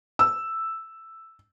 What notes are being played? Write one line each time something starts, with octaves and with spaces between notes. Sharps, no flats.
E6